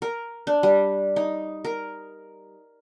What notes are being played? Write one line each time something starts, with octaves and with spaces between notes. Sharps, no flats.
A#4
D4
G3
D#4
A#4